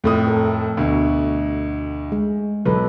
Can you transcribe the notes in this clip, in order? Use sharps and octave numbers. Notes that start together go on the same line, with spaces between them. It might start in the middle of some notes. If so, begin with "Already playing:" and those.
F2 A2 A3 D#6
A4 A#4
D2 B2
G#3
B1 E3 A4 B4